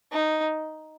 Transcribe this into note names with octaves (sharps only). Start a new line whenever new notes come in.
D#4